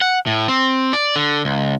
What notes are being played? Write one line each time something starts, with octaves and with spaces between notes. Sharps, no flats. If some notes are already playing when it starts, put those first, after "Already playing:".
F#5
A2
C4
D5
D3
C#2